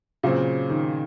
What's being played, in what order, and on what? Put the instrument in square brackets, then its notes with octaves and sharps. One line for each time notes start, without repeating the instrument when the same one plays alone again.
[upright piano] A#2 F#3 C4 [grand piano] C#3
[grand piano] D#3